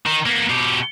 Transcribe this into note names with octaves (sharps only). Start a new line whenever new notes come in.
D#3 D#4
A#3 B3
B2 G4